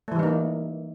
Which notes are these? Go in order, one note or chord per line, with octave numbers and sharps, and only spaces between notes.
E3 G3 A3 A#3 D#4